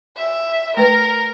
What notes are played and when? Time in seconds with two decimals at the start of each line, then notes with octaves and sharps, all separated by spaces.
0.18 E5
0.77 A3 A#4 B4 A#5